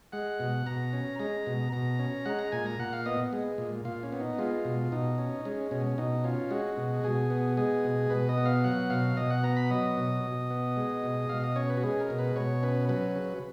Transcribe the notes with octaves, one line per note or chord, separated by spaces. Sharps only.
G#3 F#5
B2
B2 A#5
C#4
G#3 A#5
B2
B2 A#5
C#4
G#3 F#5
A#5
A#2 G#5
A#5
A#2 F#5
F5
B3 D#5
G#3
A#2
A#2 F4
C#4
B3
D#4
G#3 F4
B2
B2 D#4
C#4
G#3 C#4
B2 C#4
B2 D#4
C#4 F4
G#3 F#4
B2
B2 G#4
B3
G#3 G#4
B2
B2 B4
D#5
B3
F5
F#3 F#5
B2 F5
B2 D#5
F#5
B3 A#5
B5
F#3 D#5
B2
B2
B3
G#3
B2
B2 F5
D#5
C#4 C#5
B4
F#4
G#3 G#4
A#4
B2
B4
B2 C#5
C#4 B4
F#3 B4
C#3